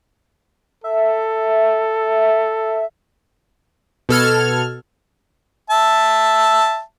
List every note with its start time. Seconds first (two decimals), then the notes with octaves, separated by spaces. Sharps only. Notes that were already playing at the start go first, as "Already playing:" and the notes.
0.84 A4 E5
4.09 B2 A4 F6 G#6
5.70 E5 A5